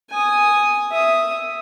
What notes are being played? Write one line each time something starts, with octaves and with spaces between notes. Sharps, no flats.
G#5 D#6
E5 D#6